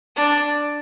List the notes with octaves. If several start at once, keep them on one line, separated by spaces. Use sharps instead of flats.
D4